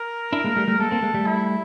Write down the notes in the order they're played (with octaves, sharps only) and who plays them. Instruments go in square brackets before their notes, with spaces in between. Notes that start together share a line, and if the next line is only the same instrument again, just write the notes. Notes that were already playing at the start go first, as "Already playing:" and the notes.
Already playing: [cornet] A#4
[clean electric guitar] D4 E4
G#3 A#3
G3 A3
G3 A3
[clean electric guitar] G#3 A#3 [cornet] A4
[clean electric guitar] A#3 C4
G#3 A#3
G3 A3
[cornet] E4